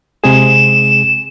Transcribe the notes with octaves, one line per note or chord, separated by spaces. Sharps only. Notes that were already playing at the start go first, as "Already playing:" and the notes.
C3 G#3 G#4 E7